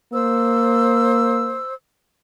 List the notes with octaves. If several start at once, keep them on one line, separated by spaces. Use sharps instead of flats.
A#3 C5 E6